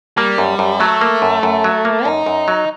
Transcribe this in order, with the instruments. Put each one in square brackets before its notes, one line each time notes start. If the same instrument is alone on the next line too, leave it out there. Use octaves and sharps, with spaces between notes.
[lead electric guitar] G3 [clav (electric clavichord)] A#3
[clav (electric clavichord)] F#2
F#2
[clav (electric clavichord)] F#3 [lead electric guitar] A3
[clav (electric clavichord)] A#3
F#2
F#2
F#3
A#3
[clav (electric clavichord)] F#2 [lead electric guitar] D#4
[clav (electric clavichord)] F#2
F#3